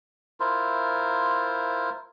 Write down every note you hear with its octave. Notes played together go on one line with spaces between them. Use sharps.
E4 F4 A#4 C5